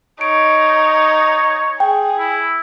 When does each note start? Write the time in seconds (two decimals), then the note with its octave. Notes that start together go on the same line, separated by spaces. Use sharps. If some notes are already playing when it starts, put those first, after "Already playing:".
0.21 D#4 C#5 D7
1.80 G#4 G5
2.18 E4